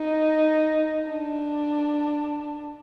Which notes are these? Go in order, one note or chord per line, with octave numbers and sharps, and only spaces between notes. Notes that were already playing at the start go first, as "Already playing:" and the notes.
Already playing: D#4
D4